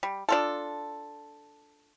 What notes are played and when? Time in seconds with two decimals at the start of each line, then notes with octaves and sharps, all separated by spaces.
0.03 G3
0.29 D4 F4 A4